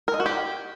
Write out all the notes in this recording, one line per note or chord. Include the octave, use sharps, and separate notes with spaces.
A#4
D#5
F#4
G4